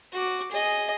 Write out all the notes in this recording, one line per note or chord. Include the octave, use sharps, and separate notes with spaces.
F#4 D6
G#4 D#5